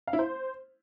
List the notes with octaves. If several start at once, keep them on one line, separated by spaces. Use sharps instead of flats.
F5
E4
C5